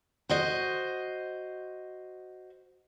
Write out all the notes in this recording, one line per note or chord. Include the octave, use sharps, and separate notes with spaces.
F#4 C5 D#5